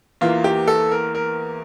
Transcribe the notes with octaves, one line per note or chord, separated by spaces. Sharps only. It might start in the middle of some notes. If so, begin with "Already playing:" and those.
E2 E3 A#3 F4
G4
A4
A#4
A#4